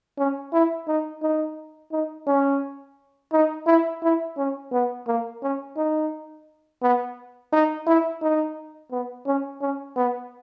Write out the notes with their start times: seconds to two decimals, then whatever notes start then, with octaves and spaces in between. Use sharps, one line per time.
0.18 C#4
0.53 E4
0.88 D#4
1.23 D#4
1.92 D#4
2.27 C#4
3.32 D#4
3.67 E4
4.03 E4
4.37 C#4
4.72 B3
5.07 A#3
5.43 C#4
5.77 D#4
6.82 B3
7.52 D#4
7.87 E4
8.22 D#4
8.91 B3
9.27 C#4
9.61 C#4
9.97 B3